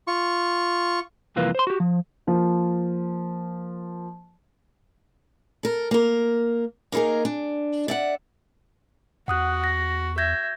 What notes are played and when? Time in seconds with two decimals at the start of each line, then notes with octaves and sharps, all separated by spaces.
0.07 F4 C#6
1.36 C2 F2 E3 A#3 F4 B4
1.55 C5 C6
1.67 F#4 G4
1.80 F3
2.27 F3 A#3
5.63 A4 A#4
5.91 A#3 A#4
6.92 A#3 D#4 E4 G#4 A#4
7.25 D4
7.88 D5 E5 F#5
9.28 E2 F#4 F#5 D#6 F#6
9.64 A#6
10.18 E5 G6 G#6 A#6